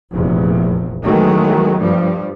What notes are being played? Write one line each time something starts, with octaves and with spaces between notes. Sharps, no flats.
F1 A#1 E2
D#3 E3 F#3 G#3 A3 B3
G2 F3 G3